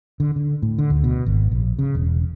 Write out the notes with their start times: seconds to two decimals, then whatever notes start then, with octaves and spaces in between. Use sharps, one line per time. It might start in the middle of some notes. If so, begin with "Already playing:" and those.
0.20 D3
0.36 D3
0.62 A2
0.78 D3
0.90 D2
1.04 B2
1.26 G#1
1.51 A#1
1.79 C#3
1.95 E1